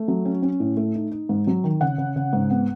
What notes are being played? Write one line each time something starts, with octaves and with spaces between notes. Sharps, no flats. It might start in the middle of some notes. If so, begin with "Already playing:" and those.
Already playing: A3
F#3
C#4
C#4
A2
A3
D#4
D#4
G#2
F#3
D#3
C#3 F#5
C#3
C#3
G#2
B3